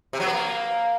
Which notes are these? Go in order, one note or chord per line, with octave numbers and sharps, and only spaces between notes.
C3
F#3
B3
A#3